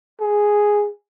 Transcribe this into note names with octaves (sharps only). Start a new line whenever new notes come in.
G#4